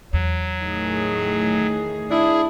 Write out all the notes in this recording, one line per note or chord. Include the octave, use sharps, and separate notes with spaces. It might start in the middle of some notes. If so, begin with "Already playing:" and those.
E2 F#3
A2 D#3 G#4
D4 E4 G#4